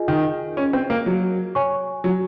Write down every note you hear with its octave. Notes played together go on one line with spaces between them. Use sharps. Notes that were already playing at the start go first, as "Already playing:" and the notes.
Already playing: F4 G#4 D#5 G#5
D#3
C#4
C4
A#3
F#3
C#5 G#5 C#6
F#3